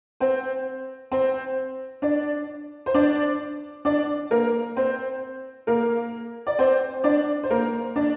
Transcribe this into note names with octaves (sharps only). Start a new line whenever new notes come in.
C4 C5
C4 C5
D4 D5
C5
D4 D5
D4 D5
A#3 A#4
C4 C5
A#3 A#4
D5
C4 C5
D4 D5
C5
A#3 A#4
D4 D5